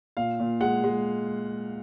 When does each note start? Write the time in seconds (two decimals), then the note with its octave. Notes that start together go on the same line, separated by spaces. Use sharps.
0.17 A#2 F5
0.40 A#2
0.61 G#3 F#5
0.84 G#3